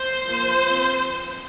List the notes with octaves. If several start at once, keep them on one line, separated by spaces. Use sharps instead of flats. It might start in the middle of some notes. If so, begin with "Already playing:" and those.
Already playing: C5
F3 A#3
F3 C4